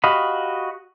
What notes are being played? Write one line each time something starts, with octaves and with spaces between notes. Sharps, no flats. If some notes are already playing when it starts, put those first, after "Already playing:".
F#4 G4 D#5 F5 B5